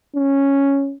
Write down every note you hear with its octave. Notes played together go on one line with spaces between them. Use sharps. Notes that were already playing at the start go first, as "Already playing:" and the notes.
C#4